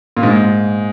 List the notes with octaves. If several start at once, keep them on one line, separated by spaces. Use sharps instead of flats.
A#2
G#2